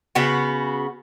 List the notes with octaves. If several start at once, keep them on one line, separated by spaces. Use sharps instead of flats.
C#3 B3 F#4